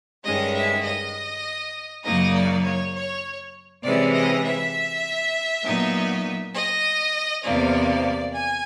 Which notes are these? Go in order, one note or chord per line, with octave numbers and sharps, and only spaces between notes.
G2 D#3 G#3 C#4 D#5
E5
D#5
F#2 C#3 F#3 A#3 D#4 D#5
D5
C#5
C#5
C3 E3 G#3 C#4 D5
D#5
E5
A#2 F#3 B3 D#4
D#5
E2 C3 F3 A#3 D5
G#5